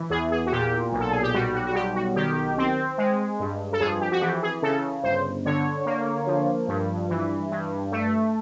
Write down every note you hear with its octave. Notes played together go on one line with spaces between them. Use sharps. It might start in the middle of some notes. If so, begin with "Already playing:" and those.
Already playing: E3
E2 G#4
G#4
F#4
A#2 G4
B1
A4
G#4
G4
G3 F#4
F#4
F#4
B1 G4
F#4
D#3 G4
C4
G#3
G2
A4
F2 G#4
G4
F#4
E3 G4
G#4
C#3 A4
G1 C5
D3 C#5
A#3
F3
G2
E3
G2
A3